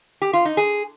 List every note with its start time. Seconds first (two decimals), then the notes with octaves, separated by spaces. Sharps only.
0.22 G4
0.33 F4
0.45 D#4
0.57 G#4